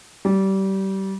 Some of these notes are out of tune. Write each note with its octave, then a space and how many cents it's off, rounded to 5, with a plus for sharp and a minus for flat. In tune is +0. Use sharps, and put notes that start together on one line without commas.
G3 -25